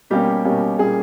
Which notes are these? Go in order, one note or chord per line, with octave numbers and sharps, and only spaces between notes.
B2 G3 A#3 C#4 G4
B2 G3 A#3 C#4
A#2 G3 A#3 C#4 G#4